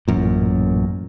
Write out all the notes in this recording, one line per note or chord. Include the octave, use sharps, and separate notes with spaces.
A1 F#2 A#2